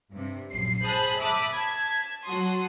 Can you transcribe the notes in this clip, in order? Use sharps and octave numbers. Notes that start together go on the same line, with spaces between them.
G2 C3
A#1 F#2 C7
G#4 C5 A5 B5 D#6 F#6
E5 A5 B5 D6 D#6 F#6
A5 G#6 B6
F#3 F#4 F#5 A5 C6 D#6